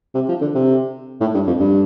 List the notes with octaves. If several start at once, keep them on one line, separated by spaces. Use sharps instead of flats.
C3
F3
D3
C3
A2
G2
F2
G2